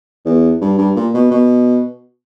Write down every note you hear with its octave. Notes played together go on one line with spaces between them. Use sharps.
E2
G2
G2
A#2
B2
B2